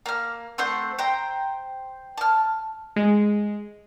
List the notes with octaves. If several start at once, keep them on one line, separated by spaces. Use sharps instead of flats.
A#3 F6
A3 C4 C5 F#5
C5 G5 A#5
A5 F6
G#3